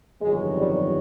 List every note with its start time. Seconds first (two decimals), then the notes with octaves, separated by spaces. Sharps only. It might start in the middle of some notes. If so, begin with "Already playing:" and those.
0.21 G1 F2 C3 D#3 F#3 G#3
0.56 G3